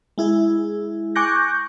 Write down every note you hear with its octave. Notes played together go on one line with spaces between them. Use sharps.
G#3 E4 G#4
G#5 C#6 D6 F#6 G6 A#6